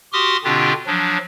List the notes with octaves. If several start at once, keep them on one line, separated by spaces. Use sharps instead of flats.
F#4 G4 C6 D6 D#6 F6
B2 D3 C4 D4 F4 G4
F3 F#3 D4